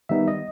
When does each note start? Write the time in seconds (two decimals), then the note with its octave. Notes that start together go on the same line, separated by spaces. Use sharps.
0.09 D#3 G3 B3 D#4 E5
0.28 D#5